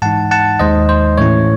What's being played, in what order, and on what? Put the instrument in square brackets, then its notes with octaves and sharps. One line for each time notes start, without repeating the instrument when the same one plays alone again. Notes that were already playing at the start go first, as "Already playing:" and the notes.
[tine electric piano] G#2 E3 G#3 D#4 F#5 A5
F#5 A5
D#2 D#3 G#3 D#4 C5 D#5
C5
A2 E3 A3 C#4 E4 C#5